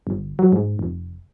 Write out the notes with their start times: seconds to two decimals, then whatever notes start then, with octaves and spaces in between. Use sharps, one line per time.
0.07 G1
0.39 F#3
0.52 G#2
0.79 F1